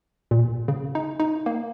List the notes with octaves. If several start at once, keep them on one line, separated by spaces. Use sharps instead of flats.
A#2
C#3
D#4
D#4
A#3